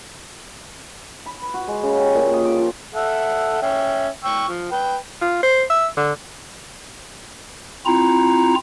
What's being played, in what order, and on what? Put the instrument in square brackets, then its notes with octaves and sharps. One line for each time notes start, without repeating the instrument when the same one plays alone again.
[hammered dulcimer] B5
B4
F#4
G#3
C#3
G4
A#2
D#5
D6
F3
[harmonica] A4 E5 F#5
C#4 E5 G5
G5 C#6 E6
F3
B4 G5
[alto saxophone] F4
C5
E5
D3
[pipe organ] C4 E4 F4 A#5